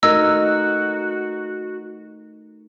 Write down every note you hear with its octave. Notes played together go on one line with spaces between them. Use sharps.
A3 D#4 F#4 A#4 D#5 A#5 E6 A#6